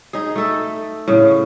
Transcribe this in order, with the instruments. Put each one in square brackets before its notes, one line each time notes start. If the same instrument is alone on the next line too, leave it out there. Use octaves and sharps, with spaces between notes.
[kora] D#4 G#4
A3 A4
A2 C#3